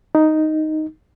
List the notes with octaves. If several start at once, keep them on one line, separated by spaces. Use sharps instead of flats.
D#4